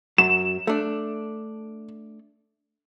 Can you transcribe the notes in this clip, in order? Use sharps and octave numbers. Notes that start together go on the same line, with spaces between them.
F#2 F#3 E7
A3 D4